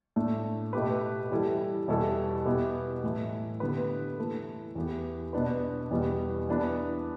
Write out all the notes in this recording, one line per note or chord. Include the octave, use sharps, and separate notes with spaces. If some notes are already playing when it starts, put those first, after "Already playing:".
A2 A3 D4
B2 A3 G4 B4
E3 G3 E4 A4
E2 B2 G3 E4 A4
B2 B3 E4 G4
A2 E3 A3 E4
D3 B3 G4 B4
E3 A3 E4 A4
E2 E3 B3 G4
B2 B3 D4 B4
E2 B2 G3 B3
E3 B3 D4 B4